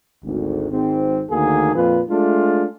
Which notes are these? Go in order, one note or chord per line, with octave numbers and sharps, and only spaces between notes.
G#1 D2
G#1 G#2 C4
D2 D#3 A#3 G#4
F2 A#2 F4 B4
G#3 A3 D4 F4